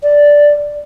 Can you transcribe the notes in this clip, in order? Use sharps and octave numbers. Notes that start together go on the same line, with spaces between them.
D5